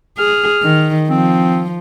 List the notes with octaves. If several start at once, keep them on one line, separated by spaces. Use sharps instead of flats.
G#4 F6
D#3
F3 C4